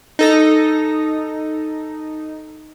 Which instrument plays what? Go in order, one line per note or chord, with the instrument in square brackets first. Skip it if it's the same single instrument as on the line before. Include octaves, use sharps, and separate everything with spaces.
[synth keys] D#4 A4 A#6